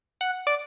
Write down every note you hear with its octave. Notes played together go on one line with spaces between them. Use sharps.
F#5
D5